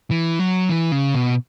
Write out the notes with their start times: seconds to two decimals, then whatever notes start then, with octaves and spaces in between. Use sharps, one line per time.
0.11 E3
0.39 F#3
0.69 E3
0.92 C#3
1.15 B2